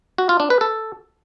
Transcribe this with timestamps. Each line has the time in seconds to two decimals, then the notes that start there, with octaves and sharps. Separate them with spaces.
0.18 F#4
0.29 F4
0.40 D4
0.50 B4
0.61 A4